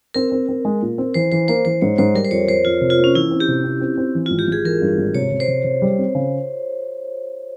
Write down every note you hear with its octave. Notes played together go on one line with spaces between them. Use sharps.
C4 A#4
C4
C4
G#3
A#2
C4
E3 C5
E3 C5
A#3 C5
E3 C5
G#2 C#5
G#2 C5
G3 A#4
C5
F2 C#5
F2 C5
F2 F4
C3
F4
A#3
C#4
E3 E4
C4
G4
C3
C4
C4
C4
E3
G#1 F4
G4
G#1 G#4
E3 A#4
G2
G#1
C3 C#5
C3
C5
C3
C3
G3
C4
C#3